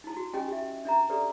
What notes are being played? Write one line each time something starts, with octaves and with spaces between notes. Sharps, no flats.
D#4 E4
F#4
C#4 G4 D#5 G5 G#5
G4 E5
D4 E5 A#5
G4 A4 B4 D5